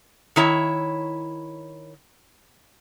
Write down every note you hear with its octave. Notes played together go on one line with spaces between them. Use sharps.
D#3 E4 C#5